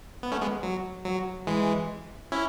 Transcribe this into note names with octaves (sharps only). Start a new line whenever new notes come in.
B3
A3 C#4
G#3 B3
F#3
F#3
E3 G#3
C#4 E4